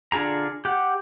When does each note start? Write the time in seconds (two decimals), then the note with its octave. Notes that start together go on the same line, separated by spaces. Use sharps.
0.12 D3 D4 F4 G#4 A#5
0.65 G4 F#5